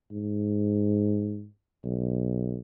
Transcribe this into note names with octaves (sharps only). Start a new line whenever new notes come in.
G#2
B1